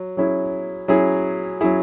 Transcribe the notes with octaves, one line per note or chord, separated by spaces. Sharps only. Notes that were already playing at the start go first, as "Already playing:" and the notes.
Already playing: F#3
F#3 C#4 E4 G#4
F#3 C#4 E4 G#4
F#3 C#4 E4 G#4